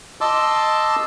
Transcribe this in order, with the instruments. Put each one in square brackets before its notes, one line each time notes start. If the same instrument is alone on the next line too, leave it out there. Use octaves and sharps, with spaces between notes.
[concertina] D#5 A5 C6 D6 E6